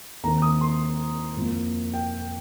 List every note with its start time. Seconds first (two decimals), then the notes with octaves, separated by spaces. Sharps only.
0.23 D#2 D#3 C4 A#5
0.42 D#6
0.61 C6
1.37 F2 F3 A#3
1.94 G5